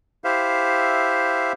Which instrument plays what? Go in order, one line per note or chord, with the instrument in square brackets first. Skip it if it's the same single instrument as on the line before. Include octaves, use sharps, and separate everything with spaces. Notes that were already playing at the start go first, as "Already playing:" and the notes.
[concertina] E4 G4 C5 E5 F5